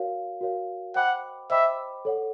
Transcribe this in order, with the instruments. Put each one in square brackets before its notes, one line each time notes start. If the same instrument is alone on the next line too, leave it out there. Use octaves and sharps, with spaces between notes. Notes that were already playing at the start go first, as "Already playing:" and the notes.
Already playing: [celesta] F#4 A#4 C#5 F5
F#4 A#4 C#5 F5
[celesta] C5 D#5 G5 B5 D6 [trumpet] F#5
[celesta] C5 D#5 G5 B5 D6 [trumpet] E5
[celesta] A4 C#5 F#5